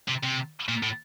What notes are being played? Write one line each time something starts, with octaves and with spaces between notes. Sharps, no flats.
C3
C3
A#2
A2